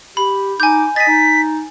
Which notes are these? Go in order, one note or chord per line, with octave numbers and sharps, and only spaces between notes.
G4 B5
D#4 G#5 D6 G6
D#5 G#5 A6 B6
D#4